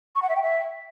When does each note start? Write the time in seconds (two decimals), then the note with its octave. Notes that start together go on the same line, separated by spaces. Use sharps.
0.15 C#6
0.22 F#5
0.29 E5
0.35 G5
0.42 E5